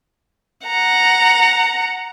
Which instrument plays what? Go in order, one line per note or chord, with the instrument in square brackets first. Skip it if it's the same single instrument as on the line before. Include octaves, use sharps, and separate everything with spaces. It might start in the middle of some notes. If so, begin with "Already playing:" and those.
[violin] F#5 A#5